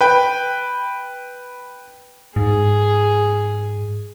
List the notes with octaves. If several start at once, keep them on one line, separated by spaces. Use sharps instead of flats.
B4 G5
G#2 G#4